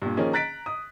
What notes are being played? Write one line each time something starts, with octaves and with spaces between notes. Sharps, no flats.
G2 A#2
D#3 F3 A#3 C#4 G#4
A#5 F#6 A6 B6 D7
D#6